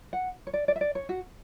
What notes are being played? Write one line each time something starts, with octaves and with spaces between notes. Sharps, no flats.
F#5
C#5
D5
D5
E5
D5
C#5
F#4